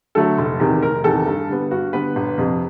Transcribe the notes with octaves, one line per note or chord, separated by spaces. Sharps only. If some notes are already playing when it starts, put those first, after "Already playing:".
D3 F#3 A3 A4
F1
E2 C3 D#3
F1 A#4
E2 C3 D#3 A4
G2
D3 G3 B3
G2 F#4
D3 G3 B3 B4
G1
F2 C3